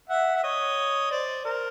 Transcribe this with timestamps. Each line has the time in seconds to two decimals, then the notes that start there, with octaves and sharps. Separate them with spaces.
0.10 E5 F#5
0.36 E5
0.43 C#5 D#5
1.11 C5 D5
1.45 A#4 C5